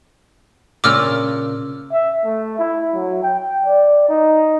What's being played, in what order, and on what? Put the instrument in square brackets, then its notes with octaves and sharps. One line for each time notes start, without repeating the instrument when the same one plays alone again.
[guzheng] A#2 C#3 A#5 [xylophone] D6 E6 F6
[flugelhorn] E5
A3
E4
F#3
G5
D5
D#4